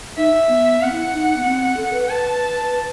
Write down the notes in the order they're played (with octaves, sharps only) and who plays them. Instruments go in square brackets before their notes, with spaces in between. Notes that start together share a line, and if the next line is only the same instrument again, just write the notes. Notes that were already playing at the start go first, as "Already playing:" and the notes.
[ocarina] D#4 [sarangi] E5
[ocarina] B3
[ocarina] C4 [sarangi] F#5
[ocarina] E4
D#4
B3
C4
A4
B4
[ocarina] B4 [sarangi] A5